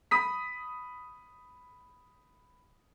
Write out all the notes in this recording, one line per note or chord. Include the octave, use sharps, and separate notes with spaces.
B5 D#6 B6